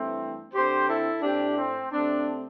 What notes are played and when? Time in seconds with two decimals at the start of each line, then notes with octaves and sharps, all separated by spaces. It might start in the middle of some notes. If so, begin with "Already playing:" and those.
Already playing: G2 E3 A3 C4
0.54 D3 C4 G4 C5
0.88 E4 A4
1.22 A2 A3 C4 D4 G4
1.57 C4
1.92 C3 A3 C4 D4